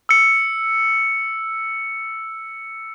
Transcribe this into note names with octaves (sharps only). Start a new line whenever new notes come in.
E6 C#7